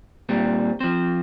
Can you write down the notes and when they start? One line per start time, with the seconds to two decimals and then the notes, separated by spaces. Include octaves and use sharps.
0.29 A#2 G3 C4
0.80 F3 C4 C5